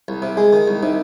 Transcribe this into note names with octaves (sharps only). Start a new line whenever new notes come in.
C2
C3
G#3 G#4
D#3
C2
C3 D#4